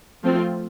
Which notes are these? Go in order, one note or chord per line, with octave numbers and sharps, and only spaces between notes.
F3 A3 C4 F4